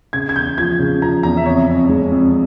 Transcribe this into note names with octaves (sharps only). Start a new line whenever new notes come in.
C#3 G#6
G#6
E2 G6
F3 G#6
C#3
F3 A#5
E2 A#5
E5
F2 C#5
F2
G#3
F2